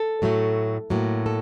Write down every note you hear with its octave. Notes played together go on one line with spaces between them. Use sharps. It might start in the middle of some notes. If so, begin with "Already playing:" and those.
Already playing: A4
A2 F#3 A3
A2 F#3 A#3
A4